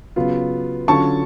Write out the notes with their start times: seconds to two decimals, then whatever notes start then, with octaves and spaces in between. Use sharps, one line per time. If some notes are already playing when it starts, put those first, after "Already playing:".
0.16 C#3 F#3 B3 F4
0.88 D3 F#3 C#4 F4 A5 C#6